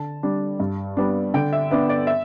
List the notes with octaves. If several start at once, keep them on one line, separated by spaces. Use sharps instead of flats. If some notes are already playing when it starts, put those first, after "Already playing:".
Already playing: D3 A5
G3 D4
G2
G3 B3 D4
D3 G5
E5
B3 D4 E5
D5
E5